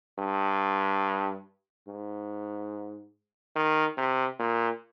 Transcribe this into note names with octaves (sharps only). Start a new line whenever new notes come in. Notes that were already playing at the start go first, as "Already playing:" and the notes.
G2
G#2
D#3
C3
A#2